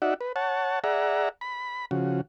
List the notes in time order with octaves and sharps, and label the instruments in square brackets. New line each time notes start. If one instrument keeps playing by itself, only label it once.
[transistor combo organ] D#4 F#4 D5 E5 F#5
B4
C#5 F#5 A5
G#4 D5 E5 F#5 A#5
B5
C#3 F3 F#4